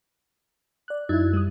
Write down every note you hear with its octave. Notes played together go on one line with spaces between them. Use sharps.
D5 F#6
F#2 D#4 E4
G3 D#6